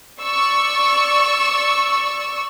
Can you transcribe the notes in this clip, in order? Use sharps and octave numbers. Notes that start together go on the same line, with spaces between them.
D5 C#6 E6